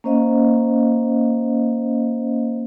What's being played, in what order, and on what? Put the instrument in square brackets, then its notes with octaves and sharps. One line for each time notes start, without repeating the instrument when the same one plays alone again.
[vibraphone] A#3 C#4 C5 D#5 F5